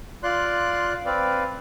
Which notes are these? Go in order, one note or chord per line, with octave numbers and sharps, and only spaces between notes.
F4 D5 C6 F#6
C4 B4 D5 F5